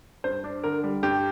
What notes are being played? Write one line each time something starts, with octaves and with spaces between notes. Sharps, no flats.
G2 C5
D4
D3 A#4
G3
G2 G4